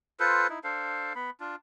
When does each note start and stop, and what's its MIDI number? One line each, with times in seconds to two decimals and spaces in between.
0.20 0.47 65
0.20 0.47 69
0.20 0.47 71
0.20 0.47 72
0.49 0.59 63
0.49 0.59 64
0.64 1.13 62
0.64 1.13 69
0.64 1.13 72
0.64 1.13 77
1.15 1.30 59
1.15 1.30 83
1.40 1.56 62
1.40 1.56 65